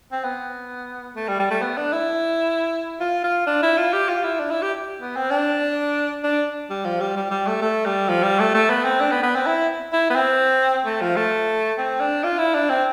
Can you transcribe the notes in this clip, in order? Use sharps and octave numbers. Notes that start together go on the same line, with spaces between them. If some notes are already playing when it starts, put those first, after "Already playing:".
C4
B3
A3
G3
G3
A3
B3
D4
E4
F4
F4
D4
E4
F4
G4
F4
E4
D4
E4
G4
B3
C4
D4
D4
G3
F3
G3
G3
G3
A3
A3
G3
F3
G3
A3
A3
B3
C4
D4
B3
B3
C4
E4
E4
B3
C4
A3
F3
A3
C4
D4
F4
E4
D4
C4